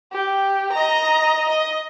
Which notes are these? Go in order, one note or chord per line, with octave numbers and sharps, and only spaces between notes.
G4
D#5 A#5
D#5